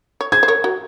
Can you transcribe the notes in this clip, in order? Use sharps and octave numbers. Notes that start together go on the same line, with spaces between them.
C#5
G#4 C5 G#6
C5
A#4 C#5
F#4 A#4